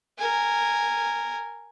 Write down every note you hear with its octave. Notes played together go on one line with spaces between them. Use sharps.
A#4 G#5